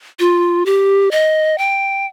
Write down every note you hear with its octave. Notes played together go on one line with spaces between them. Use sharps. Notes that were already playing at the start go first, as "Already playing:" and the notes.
F4
G4
D#5
G5